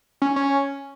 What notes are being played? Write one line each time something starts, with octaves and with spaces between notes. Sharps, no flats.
C#4
C#4